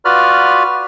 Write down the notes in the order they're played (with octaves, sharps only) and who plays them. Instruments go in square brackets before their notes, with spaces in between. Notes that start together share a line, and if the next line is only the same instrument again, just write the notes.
[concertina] F4 F#4 B4 D5 B5 F6